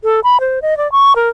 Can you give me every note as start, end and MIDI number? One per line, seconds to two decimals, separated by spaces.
0.04 0.20 69
0.24 0.40 83
0.40 0.59 72
0.62 0.77 75
0.77 0.90 74
0.92 1.15 85
1.15 1.29 70